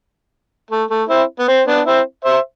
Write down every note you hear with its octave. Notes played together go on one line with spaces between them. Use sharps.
A3
A3
C4 E4
B3
C4
B3 D4
C4 E4
C5 E5